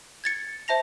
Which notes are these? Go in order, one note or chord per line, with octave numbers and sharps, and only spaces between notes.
G#6 A6 C#7
C5 E5 A5 A#6 F7